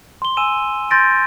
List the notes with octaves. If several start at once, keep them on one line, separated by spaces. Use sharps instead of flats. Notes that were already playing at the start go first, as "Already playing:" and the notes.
C6 G7
G#5 E6 D#7 E7
C6 G6 A6 A#6 D7